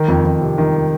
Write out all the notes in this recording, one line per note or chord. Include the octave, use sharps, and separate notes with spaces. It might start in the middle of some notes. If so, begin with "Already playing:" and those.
Already playing: D#3
F2
F2
C3
D#3